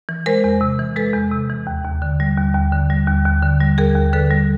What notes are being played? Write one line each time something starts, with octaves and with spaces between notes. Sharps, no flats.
E3
G#3 A#4 C5
E2
C3
E3
G#3 A4 B4
E2
C3
E3
D#2
D#2
D3
G3
D#2
D#2
D3
G3
D#2
D#2
D3
G3
D#2 G#4 A#4
D#2
D3 A4 B4
G3